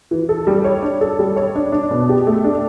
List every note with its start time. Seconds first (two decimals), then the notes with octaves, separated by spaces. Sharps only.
0.11 E3
0.29 A4
0.47 G3
0.64 C#5
0.82 D4
1.01 A4
1.19 G3
1.36 C#5
1.55 D4
1.72 D4
1.91 B2
2.09 G4
2.27 A3
2.44 D4